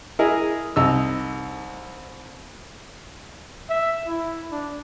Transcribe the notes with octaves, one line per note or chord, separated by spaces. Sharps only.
E4 G#4 A#4 D#5
C2 D#4 E6
E5
E4
D4